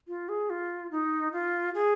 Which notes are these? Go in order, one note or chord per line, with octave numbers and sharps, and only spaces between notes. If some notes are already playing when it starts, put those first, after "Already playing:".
F4
G#4
F4
D#4
F4
G#4